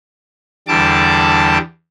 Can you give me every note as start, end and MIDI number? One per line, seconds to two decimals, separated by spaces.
0.68 1.58 40
0.68 1.58 50
0.68 1.58 55
0.68 1.58 81
0.68 1.58 86